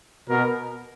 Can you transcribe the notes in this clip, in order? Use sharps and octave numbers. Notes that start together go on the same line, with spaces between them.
B2 A#4